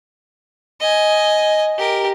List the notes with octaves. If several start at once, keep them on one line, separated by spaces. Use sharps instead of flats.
D#5 G#5
G4 A#4